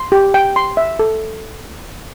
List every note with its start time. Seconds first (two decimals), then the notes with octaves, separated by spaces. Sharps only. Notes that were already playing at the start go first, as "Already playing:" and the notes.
Already playing: C6
0.12 G4
0.34 G5
0.56 C6
0.77 E5
0.99 A4